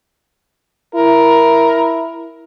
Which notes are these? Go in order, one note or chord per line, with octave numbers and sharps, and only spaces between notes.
E4 A#4